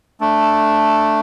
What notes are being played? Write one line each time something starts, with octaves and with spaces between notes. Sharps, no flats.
A3 D4